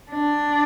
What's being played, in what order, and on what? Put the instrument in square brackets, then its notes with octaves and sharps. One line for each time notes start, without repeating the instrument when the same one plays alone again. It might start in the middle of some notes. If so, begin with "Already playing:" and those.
[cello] D4